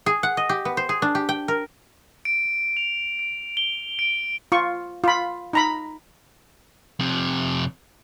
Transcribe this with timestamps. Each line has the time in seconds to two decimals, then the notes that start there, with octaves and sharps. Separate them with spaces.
0.06 G#4
0.23 F#5
0.37 D#5
0.49 G4
0.65 B3
0.77 C5
0.89 G#4
1.02 D4
1.15 G4
1.29 G5
1.48 A#4
2.25 D7
2.77 F7
3.19 D7
3.57 G7
3.99 D7
4.52 F4 C#6
5.04 F4 B5
5.53 D#4 A#5 B5
7.00 F2 C3